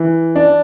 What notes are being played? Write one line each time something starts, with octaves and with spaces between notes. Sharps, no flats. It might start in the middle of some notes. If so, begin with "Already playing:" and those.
Already playing: E3
D4